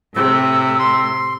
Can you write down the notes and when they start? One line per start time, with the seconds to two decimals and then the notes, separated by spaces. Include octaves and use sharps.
0.15 A2 C3 E6
0.79 C6